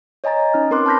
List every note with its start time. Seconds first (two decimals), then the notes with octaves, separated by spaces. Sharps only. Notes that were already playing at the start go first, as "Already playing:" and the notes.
0.24 C#5 D#5 G#5 A#5 A6
0.54 C#4 D#4 F6
0.71 C4 A#4 B4 C6 D6 F#6
0.86 A5 B5 F6 G6 A#6 B6